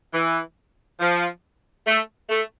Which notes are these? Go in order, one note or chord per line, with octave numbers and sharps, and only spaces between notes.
E3
F3
A3
A3